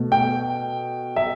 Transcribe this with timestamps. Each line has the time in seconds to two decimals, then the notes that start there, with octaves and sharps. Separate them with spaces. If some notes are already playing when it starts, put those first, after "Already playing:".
Already playing: B2 A3
0.12 G5
1.16 E5